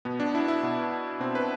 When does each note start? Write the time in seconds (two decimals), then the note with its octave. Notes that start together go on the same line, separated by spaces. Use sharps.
0.05 B2 B3
0.20 D4
0.35 E4
0.48 E4
0.63 B2
1.20 B2 C4
1.35 B4